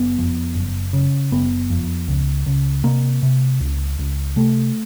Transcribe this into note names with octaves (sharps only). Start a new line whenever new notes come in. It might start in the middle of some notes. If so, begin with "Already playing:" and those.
Already playing: F#1 B3
F2
F#1
C#3
F#1 B3
F2
C#2
C#2
C3 A#3
C3
C#2
C#2
C3 A3